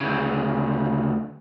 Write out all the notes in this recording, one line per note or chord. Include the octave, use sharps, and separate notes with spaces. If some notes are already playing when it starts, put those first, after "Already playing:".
D2 C#3